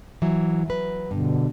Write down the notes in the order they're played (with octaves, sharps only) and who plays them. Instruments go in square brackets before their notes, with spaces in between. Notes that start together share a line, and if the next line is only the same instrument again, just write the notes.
[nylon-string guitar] E3 F#3
F#3 B4
[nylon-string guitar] G2 [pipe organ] B2 D3